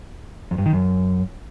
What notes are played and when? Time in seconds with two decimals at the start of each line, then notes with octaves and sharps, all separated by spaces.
0.51 F2
0.58 G2
0.66 D#3
0.73 F#2